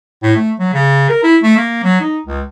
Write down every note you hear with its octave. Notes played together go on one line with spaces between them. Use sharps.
A2
A3
F#3
C#3
A#4
E4
A3
A#3
F#3
D#4
C#2